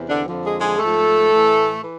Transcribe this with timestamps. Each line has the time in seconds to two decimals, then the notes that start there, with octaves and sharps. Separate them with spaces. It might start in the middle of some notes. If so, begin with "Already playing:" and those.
Already playing: E2 C3
0.09 D3 D4
0.26 F2 D3 F3
0.44 G#3 G#4
0.61 G#3 G#4
0.78 G#2 F3 A3 A4
1.30 A2 E3
1.82 E3